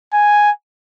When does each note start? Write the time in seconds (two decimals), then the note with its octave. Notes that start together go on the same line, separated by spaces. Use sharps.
0.13 G#5